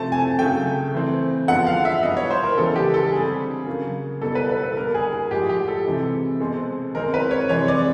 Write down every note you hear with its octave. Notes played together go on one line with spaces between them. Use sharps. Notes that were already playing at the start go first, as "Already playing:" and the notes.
Already playing: C3 F3 A3 C4 A5
G#5
C#3 F#3 A3 G5
E3 A3 C4
D3 F3 G#3 B3 F#5
F5
E5
B2 G3 B3 D#5
C#5
C5
A#4
C#3 E3 G#3 B3 A4
G4
A4
D3 G3 C4 G#4
C#3 F#3 A#3
B2 G3 A#3 A4
B4
B4
A4
D3 G3 A#3 A#4
G#4
G#4
A2 F3 G#3 G4
G4
A4
C3 E3 G#3
B2 G#3 C4
D#3 G#3 C4 A#4
B4
C#5
C3 E3 G#3 C4 C#5
D5